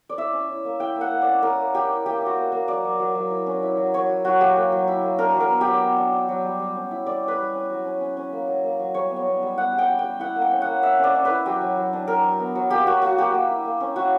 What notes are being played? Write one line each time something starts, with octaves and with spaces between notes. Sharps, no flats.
D5
E4 E5
C#4
E4
A#3
E4 G5
A#3
F#5
A#3
D5
C#4
E4 A#4
A#3
E4 G4
E4
A#3 G4
E4
F#4
A#3
A#3
F#3 D5
F#3
F#3
F#3
E4
C#4
E4
F#3
F#3 C#5
F#3
F#3 F#4
A#3 G4
A#3
F#3
E4
A#3
D4 A#4
F#3
A#4
B3
G4
F#3
B3
D4
D4
F#3
G3
G3
C#4
E4
G3 D5
C#4
B4
G3
C#4
F#3
C#4
C#4
C#4
A#3
F#3
A#3
F#3
G3 C#5
B3
C#5
B3
G3
B3 F#5
G3
G5
G3
G5
G3
E4 F#5
A#3
G5
C#4
A#3 F#5
A#3 E5
C#4 D5
C#4
E4 B4
F#3 G4
F#3
F#3
D4
D4 A#4
F#3
B3
F#3
A#3 G4
A#3 F#4
A#3 F#4
A#3 G4
A#3
E4
A#3
C#4
E4 F#4